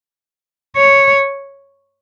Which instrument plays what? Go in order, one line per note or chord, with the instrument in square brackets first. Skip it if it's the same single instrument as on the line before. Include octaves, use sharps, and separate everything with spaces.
[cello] C#5